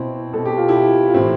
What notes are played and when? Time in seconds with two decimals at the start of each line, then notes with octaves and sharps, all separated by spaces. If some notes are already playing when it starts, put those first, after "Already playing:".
Already playing: B2 C4 E4
0.33 B2 A4
0.45 G4
0.57 F4
0.68 E4 G4
1.08 F4
1.14 A2 E3 C4 E4